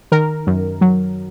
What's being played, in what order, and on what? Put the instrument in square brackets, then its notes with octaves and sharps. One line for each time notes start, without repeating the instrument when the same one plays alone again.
[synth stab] D#3 A#4
F#2
F#3